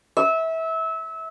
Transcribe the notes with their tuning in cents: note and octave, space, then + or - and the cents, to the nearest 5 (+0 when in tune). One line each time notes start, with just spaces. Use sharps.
E5 -25